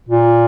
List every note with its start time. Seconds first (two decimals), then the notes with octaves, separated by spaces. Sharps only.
0.09 A#2